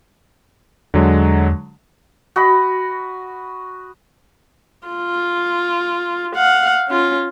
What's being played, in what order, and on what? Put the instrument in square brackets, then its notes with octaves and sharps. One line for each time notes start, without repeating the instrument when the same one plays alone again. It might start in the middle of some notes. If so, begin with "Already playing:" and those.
[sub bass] E2 [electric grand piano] D3 F#3 G#3
[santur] F#4 D#5 B5
[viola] F4
F5 F#5
C#4 F4